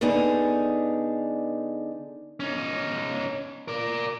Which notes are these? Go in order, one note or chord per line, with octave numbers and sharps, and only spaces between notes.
D3 B3 D4 D#4 G#4
C#4 D#4
A#4 D5